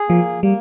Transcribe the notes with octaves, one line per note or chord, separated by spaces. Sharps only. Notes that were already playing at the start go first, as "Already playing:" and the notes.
Already playing: G#4
F3 A#3
G3 A#3